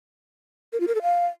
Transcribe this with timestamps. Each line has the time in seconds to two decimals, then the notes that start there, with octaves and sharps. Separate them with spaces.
0.73 A#4
0.80 F4
0.88 A#4
0.95 A4
1.02 F5